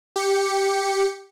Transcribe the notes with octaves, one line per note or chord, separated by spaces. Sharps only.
G4 C#7